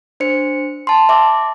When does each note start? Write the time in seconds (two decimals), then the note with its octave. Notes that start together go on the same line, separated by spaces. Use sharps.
0.20 D4 C5 C#7
0.87 A5 C6
1.09 E5 D6